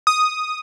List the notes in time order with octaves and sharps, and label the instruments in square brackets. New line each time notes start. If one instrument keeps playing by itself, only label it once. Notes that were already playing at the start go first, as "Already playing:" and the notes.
[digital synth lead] D#6